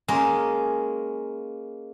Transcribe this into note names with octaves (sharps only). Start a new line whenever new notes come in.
G#3 A#3 C#4 A#4